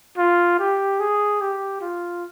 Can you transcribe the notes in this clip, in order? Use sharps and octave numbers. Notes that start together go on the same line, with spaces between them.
F4
G4
G#4
G4
F4